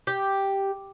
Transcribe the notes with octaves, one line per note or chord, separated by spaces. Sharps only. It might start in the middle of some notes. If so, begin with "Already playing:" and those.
G4